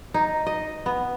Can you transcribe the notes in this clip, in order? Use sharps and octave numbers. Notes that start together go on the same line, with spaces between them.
D#4
D#5
B3